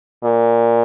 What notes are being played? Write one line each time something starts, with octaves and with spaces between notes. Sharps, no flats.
A#2